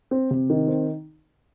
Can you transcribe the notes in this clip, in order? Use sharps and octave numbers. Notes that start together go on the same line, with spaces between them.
C4
C3
D#3
C4